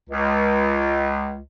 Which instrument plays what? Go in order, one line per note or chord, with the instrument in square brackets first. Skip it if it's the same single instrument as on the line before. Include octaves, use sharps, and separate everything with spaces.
[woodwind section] C#2